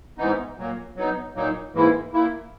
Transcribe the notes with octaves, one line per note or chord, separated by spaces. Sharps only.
G#2 E3 B3 D#4
A#2 F#3 A#3
F#3 B3 D#4
A#2 F#3 A#3 D#4
G#2 E3 A#3 E4
A#2 A#3 E4